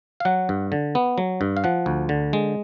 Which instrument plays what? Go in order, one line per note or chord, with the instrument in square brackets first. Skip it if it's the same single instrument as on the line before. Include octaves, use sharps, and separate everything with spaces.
[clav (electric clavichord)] F5
F#3 F#5
G2
D3
B3
F#3
G2
F5
F3 F#5
D2
D3
G#3